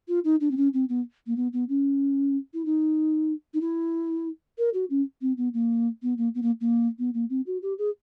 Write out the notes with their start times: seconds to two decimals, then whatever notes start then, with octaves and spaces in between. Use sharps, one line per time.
0.08 F4
0.25 D#4
0.41 D4
0.51 C4
0.57 C#4
0.74 C4
0.89 B3
1.27 A#3
1.37 B3
1.53 B3
1.69 C#4
2.54 E4
2.65 D#4
3.54 D#4
3.61 E4
4.58 A#4
4.74 F#4
4.90 C#4
5.22 C4
5.37 B3
5.54 A#3
6.03 B3
6.18 A#3
6.35 B3
6.43 A#3
6.61 A#3
6.99 B3
7.14 A#3
7.30 C4
7.47 F#4
7.62 G4
7.78 G#4